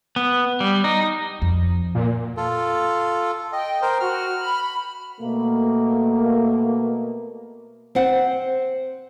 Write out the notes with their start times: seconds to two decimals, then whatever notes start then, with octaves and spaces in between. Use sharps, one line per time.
0.16 B3
0.60 G3
0.84 D#4
1.42 F2
1.95 A#2
2.37 F4 A4
3.53 D#5 G5
3.82 A#4 C5
4.00 F#4 F6
4.40 B5
5.20 B2 A3 A#3
7.95 C4 C5 F#5